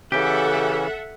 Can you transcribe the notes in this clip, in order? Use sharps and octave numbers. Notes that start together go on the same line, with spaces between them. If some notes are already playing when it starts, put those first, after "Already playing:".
C#3 E3 C#4 G4 A4 E5 F#5